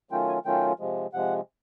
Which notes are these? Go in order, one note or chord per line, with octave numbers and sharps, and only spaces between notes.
D#3 F#3 A3 C#4 F4 G5
G#5
D#3 F#3 A3 C#4 F4 G5
C3 F3 G#3
C3 F3 G#3 F#5